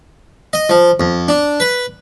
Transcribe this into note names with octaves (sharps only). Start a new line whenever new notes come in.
D#5
F3
F2
D4
B4